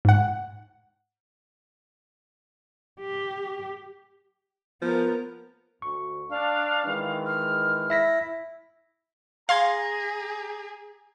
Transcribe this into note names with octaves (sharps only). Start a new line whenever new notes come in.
G#2 F#5
G4
F3 B3 A#4
D2 C#6
D4 F5
D#3 E3 G#3
F6
E4 E5 A#6 B6
G#4 F5 A#5 C6 G#6